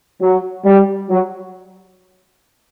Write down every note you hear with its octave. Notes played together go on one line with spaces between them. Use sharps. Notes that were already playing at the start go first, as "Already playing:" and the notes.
F#3
G3
F#3